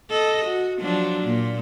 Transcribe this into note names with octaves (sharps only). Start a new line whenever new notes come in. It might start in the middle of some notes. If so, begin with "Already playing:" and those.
A4 D#5
F#4
F3 F#3 D4
A#2